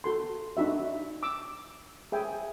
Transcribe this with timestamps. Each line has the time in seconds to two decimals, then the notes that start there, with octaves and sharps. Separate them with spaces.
0.04 F#4 A4 C6
0.57 D4 D#4 F#4 E5
1.23 D6 E6
2.12 G#4 E5 G5 G#5